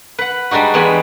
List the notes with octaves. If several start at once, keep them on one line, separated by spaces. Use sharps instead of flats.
B4 F#5
G3 G#3 D4 D#4 F#4
E2 G3 G#3 B3 D#5 G#5